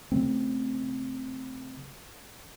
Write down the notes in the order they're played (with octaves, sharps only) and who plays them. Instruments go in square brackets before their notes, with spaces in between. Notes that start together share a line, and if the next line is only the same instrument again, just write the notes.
[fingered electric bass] C#3 F#3 A3 C4